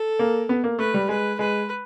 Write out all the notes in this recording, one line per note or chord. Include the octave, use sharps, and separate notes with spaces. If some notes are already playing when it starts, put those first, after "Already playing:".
Already playing: A4
A#3
B3
A#3
A3 B4
G3
G#3 B4
G#3 B4